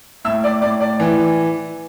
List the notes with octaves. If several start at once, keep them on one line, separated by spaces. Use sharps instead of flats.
A2 E5 E6
D5 D6
A2 D5 D6
D5 D6
E3